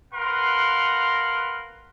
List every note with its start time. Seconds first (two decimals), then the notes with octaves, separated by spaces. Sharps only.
0.13 A#4 B4 F5 F#5 C6